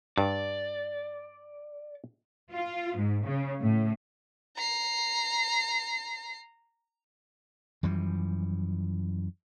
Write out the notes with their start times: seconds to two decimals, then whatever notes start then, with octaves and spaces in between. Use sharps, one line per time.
0.18 G2 D5
2.52 F4
2.97 G#2
3.25 C#3
3.62 A2
4.57 A#5 C7
7.83 F#2 E3 F3 G3